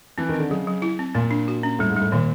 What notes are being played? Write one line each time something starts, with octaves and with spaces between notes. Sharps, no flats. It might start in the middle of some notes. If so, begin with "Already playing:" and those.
E3 C4
D#3 C4
D3
C#3 F#3
F#3
E4
C4
A#2 A#3
D4
F#4
C#4
A2 G3
G#2
G3
A2
A#2 D#3